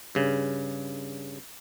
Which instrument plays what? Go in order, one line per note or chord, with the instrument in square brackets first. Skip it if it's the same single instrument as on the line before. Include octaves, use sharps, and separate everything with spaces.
[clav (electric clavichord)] G2 C#3